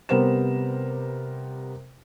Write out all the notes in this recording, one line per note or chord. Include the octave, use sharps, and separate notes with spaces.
C3 G3 B3 A#4 C5 E7